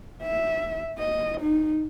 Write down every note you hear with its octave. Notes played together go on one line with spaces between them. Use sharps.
E5
D#5
D#4